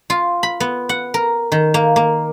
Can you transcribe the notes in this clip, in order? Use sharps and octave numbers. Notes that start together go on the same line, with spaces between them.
F4
B5
B3
F#5
A#4
D#3
A#3
A#3